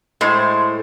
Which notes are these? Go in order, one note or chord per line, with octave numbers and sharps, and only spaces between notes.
A2 G#3 C5